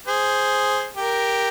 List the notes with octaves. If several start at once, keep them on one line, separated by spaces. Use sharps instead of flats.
G#4 C5
G4 A#4